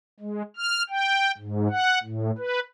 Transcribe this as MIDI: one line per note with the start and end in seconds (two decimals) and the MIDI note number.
0.20 0.42 56
0.57 0.83 89
0.89 1.31 79
1.38 1.68 44
1.70 1.99 78
2.03 2.31 45
2.38 2.60 71